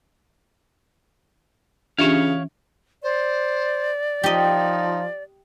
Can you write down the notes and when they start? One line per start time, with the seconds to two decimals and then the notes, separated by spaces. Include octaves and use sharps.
1.98 C#3 E3 C#4 D4 F4 G4 C#5 F5
3.03 C5 D5
4.24 F3 D#4 G4 D#5